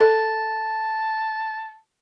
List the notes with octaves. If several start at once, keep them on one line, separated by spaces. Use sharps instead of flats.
A4 A5